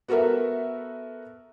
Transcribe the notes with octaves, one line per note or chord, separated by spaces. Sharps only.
B3 F#4 A4 A#4 E5